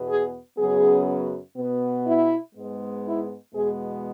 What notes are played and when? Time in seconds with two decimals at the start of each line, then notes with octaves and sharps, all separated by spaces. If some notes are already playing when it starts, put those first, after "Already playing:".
Already playing: E2 B2 B3
0.09 G#4
0.58 F#2 C#3 F#3 B3 G#4
1.57 B2 B3
2.07 E4
2.55 G#2 G#3 B3
3.05 E4
3.54 E2 B2 G#3 B3 G#4